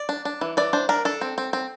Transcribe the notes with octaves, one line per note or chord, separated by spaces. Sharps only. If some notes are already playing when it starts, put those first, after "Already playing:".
Already playing: D5
D4
D4
E3
E3 D5
D4 C5
D4 A#4
D4 A4
C4
C4
C4